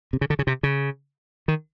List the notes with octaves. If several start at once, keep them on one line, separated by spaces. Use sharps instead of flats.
C3
C#3
D3
C#3
C3
C#3
D#3